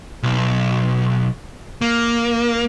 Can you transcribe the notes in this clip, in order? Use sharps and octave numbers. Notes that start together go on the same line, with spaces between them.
B1
A#3